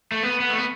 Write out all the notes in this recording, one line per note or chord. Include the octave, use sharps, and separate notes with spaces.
A3
B3
B3
A3
B3